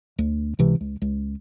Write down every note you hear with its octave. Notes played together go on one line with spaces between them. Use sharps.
D2
C#2 C3 E3
C#2
C#2